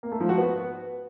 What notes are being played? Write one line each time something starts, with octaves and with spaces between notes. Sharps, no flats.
A#3
A3
F3
F#4
B3